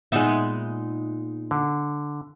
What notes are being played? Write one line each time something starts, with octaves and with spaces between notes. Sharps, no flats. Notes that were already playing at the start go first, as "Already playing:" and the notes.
A#2 G#3 B3 D#4 E5
D3